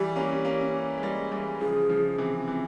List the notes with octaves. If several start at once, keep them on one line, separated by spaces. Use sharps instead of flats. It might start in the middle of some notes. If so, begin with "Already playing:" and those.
Already playing: E3 G3 G4
A#3 C#4
A#3 C#4
G#3
G3 A#3
E3 G3
C#3 F3 G#4
C#3 F3
C3 E3
C3 E3